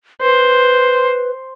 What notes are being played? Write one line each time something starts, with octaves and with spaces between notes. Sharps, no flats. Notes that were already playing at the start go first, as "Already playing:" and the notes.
B4 C5